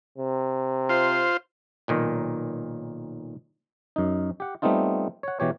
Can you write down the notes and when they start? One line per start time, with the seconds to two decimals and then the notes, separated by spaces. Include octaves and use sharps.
0.18 C3
0.89 F4 C5
1.88 B1 A#2 D#3
3.96 F#2 D#4
4.40 G4 F#5
4.62 G3 A3 B3 C4 D#4 F4
5.23 C#5 F#5
5.40 B2 E3 G4 C#5